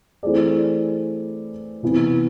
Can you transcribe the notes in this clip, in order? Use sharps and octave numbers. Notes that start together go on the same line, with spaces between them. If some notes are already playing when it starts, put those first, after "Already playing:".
E3 A3 C4 G#4 D5
C3 E3 B3